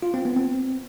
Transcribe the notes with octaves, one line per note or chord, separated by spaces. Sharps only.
F4
C4
B3
C4